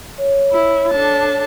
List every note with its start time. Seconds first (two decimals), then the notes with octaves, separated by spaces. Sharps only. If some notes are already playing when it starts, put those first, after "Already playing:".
0.18 C#5
0.51 E4
0.92 D4 A4 A5